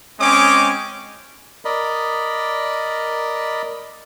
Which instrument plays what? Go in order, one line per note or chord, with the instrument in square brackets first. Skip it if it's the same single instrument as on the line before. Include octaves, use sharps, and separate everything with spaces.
[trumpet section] G#3 C4 C#4 C#5 D#5 D6
[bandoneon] A#4 D5 D#5 B5